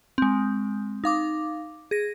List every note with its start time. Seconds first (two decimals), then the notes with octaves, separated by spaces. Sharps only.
0.18 G#3 C4
1.04 D#4 F5 D6
1.91 G#4 A#6